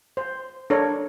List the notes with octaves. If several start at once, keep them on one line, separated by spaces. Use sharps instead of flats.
C5
D4 A4 A#4 C#5